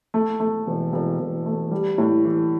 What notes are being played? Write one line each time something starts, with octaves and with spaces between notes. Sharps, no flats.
A3
A3
E1
E1
E1
A3
G3
A2
E3